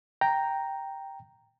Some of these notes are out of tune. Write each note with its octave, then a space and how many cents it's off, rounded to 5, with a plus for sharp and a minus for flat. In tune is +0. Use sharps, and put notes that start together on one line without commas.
G5 +0 A#5 +0